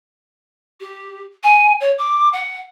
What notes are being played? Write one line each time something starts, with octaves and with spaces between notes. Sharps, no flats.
G4
G#5
C#5
D6
F#5